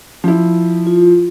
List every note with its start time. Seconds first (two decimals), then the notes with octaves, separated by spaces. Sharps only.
0.24 F3 E4
0.87 F4